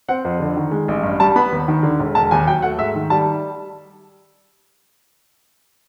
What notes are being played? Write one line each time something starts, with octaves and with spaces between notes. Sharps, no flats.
C4 F#5
F2
D3
D#3
G#3
A1
G2
G3 A5
B3 B5
D#2
D#3
D3
E1
E1 A5
D#2 G#5
F#3 G5
A3 F#5
G#2 E5
D#3
G3 A5